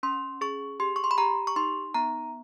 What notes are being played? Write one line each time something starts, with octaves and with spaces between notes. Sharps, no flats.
C#4 C6
G#4 C#6
G4 C6
C#6
C6
B5
G4 A#5
C#6
D#4 C6
B3 A#5